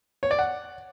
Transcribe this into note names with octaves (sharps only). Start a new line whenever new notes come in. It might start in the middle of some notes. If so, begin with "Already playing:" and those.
C#5
D5
F#5